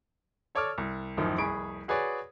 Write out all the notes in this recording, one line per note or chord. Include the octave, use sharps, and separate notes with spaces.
A4 C#5 D5 D6 E6 F6
C2
A1 F#2 D#3 F3
F1 C2 G#4 B5 C#6 D7
F#4 G#4 B4 C#5 D5